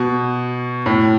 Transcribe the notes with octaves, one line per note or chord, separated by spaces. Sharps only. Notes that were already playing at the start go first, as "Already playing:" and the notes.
Already playing: B2
A2